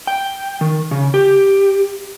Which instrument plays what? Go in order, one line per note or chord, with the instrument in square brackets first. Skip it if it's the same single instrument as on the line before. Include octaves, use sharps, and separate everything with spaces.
[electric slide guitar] G5
D#3
C#3
G4